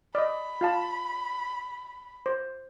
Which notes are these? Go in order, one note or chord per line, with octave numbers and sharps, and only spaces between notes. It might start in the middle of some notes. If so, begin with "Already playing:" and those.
D5 D#5 B5
F4 F5 A5
C5